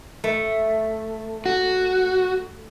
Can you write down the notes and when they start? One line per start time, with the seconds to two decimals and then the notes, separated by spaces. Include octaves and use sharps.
0.24 A3
1.46 F#4